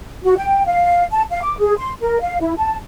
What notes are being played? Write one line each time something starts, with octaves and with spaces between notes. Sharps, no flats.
F#4
G5
F5
A5
F5
D6
G#4
C6
A#4
F5
E4
A5